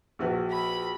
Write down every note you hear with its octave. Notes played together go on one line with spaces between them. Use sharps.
A#1 F#4 B4
B5